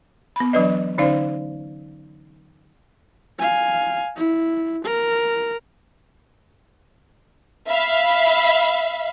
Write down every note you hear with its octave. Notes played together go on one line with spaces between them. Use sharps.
B3 B5
E3 F#3 D4 B4 D5 D#5
D3 C#4 D#4 C5 D5 F5
F5 G#5
E4
A#4
E5 F5 B5